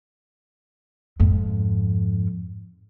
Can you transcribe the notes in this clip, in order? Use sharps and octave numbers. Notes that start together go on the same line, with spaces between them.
F2 G#2